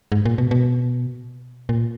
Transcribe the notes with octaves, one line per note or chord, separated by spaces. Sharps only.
G#2
A#2
B2
B2
A#2